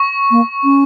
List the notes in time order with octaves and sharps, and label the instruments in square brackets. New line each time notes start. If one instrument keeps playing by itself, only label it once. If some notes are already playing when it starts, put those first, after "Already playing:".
Already playing: [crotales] C#6
[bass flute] A#3
C#4